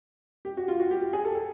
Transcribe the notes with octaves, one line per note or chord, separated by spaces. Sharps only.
G4
F#4
F4
F#4
G4
G4
G#4
A4
A4